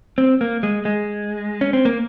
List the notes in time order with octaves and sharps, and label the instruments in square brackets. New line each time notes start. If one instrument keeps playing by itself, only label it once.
[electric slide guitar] C4
A#3
G#3
G#3
C#4
C4
A#3